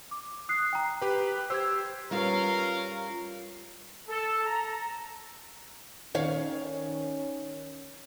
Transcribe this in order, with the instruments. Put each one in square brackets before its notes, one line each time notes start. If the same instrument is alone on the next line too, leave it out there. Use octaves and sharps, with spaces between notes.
[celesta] D6
D#6 F#6 C7
G5 A#5
[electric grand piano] G4 B4
[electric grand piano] G4 C5 [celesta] E6 G#6
[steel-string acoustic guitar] G3 F4 B4 [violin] C#4 F5 [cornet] A#4
[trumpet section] A4
A#5
[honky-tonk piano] D#3 [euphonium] C#4 [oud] C#5 F5